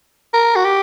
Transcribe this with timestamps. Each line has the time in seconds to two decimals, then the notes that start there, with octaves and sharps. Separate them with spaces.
0.34 A#4
0.56 F#4
0.65 G4